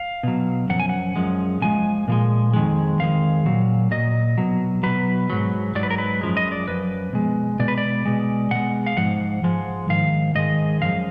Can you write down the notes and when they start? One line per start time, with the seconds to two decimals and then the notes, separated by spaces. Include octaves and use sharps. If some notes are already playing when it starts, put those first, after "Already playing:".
Already playing: F5
0.23 B2 F#3
0.70 F#2 F3 F#5
0.80 G#5
0.89 F#5
1.16 F#2 F3 G#3
1.62 A#2 F3 G#3 G#5
2.08 A#2 F3 G#3
2.54 F2 D#3 G#3
2.99 F2 D#3 G#3 F5
3.45 A#2 F#3
3.91 A#2 F#3 D#5
4.38 B2 F#3
4.83 B2 F#3 B4
5.30 G#2 F#3
5.75 G#2 F#3 D5
5.83 B4
5.90 A#4
5.98 B4
6.21 F#2 F3 G#3
6.37 D#5
6.52 D5
6.68 F#2 F3 B4
7.13 B2 G#3
7.59 B2 G#3 D5
7.68 B4
7.78 D5
8.05 B2 G#3
8.51 B2 G#3 F#5
8.87 F5
8.97 G#2 F3 F#5
9.43 G#2 F3 G#3
9.89 G#2 D#3 F5
10.35 G#2 D#3 G#3 D#5
10.81 F#2 F3 G#3 F5